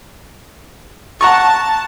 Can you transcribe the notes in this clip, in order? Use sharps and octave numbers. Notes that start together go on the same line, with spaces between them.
F#5 A5 A#5 C#6